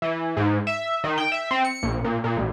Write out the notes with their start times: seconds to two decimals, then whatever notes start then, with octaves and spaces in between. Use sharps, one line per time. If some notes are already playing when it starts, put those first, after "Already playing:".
0.02 E3
0.37 G#2
0.67 E5
1.04 D#3
1.18 G5
1.32 E5
1.51 C4
1.65 C#7
1.83 A#1
2.04 A#2
2.24 A#2
2.37 A1